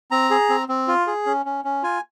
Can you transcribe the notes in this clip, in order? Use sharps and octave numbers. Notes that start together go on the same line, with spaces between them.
C4 A#5
G#4
C4
C4
F4
G#4
C#4
C#4
C#4
F4 G#5